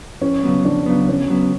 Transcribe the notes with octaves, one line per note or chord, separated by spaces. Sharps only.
F2 C#4
C#3 F#3 B3
F2 D4
C#3 F#3 B3
F2 C#4
C#3 F#3 B3